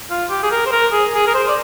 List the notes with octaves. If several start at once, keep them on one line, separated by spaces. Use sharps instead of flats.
F4
G4
G#4
A#4
C5
A#4
G#4
G#4
A#4
C5
D5